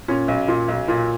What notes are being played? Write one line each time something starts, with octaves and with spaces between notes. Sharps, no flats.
A#2 C#4
B1
A#2
B1
A#2